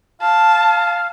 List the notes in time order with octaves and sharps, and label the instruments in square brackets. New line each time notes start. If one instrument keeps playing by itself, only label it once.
[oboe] F5 [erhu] A5